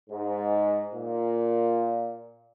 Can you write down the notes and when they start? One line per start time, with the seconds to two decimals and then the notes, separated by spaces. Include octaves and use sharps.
0.10 G#2
0.94 A#2